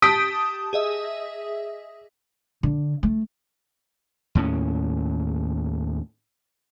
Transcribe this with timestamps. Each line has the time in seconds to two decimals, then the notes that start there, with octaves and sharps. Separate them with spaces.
0.02 G4 A5 D#6 G6 B6 D7
0.73 G#4 D#5 E5
2.63 D3
3.03 A3
4.35 D#2 A2 A3 C#4